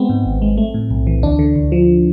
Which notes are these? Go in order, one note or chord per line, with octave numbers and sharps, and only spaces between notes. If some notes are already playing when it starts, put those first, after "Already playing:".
Already playing: G#3 B3 C4
G#2
G#1
G#3
A3
A2
B1
E3
D2 D4
D3
D2
F3